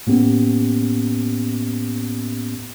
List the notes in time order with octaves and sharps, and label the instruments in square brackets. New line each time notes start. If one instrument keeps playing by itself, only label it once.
[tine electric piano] A2 A#3 B3 C#4 G4